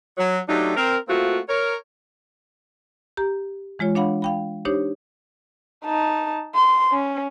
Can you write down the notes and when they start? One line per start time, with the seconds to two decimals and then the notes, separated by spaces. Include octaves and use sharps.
0.18 F#3
0.48 F#3 A3 D4 D#4 G4
0.77 C4 A#4
1.08 A3 A#3 C4 F4 F#4
1.49 A#4 C#5
3.17 G4 A#5
3.79 E3 G#3 F4 C#5
3.95 D4 C#5 F5 F#5 B5
4.22 F5 G5 B5
4.65 D4 D#4 G4 C5 C#5
5.85 D#4 A5
6.55 C6
6.92 C#4